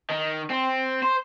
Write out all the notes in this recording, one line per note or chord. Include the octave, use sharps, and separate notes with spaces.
D#3
C4
C5